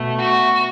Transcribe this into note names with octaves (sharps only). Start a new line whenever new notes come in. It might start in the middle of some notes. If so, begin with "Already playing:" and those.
Already playing: B2 A3
F#4